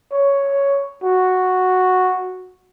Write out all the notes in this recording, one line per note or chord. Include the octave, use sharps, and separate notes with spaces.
C#5
F#4